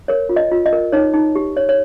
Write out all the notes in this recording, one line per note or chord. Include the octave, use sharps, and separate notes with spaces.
A#4 C#5
F4
D#5
F4
D#5
A#4
D#4 C#5
D#4
G4
C#5
C#5